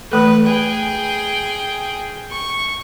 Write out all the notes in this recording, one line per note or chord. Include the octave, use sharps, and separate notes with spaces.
E3 A3 A4 B4
G#4 G5
C#6